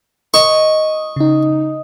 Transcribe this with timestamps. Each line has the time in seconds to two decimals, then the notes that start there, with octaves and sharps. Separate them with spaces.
0.34 D#5 C#6
1.16 C#3 D#4